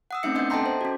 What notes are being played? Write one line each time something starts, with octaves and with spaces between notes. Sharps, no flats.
F#5 D#6 E6
A3 C4 C#4 D#4 E5 C#7
B3 D4 D#5 E5 F#5 G6
A4 D#5 G5 A5 A#5 C6
C5
C#4 F#4